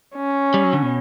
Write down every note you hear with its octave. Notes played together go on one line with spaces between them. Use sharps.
C#4
G3
F#3
D3
B2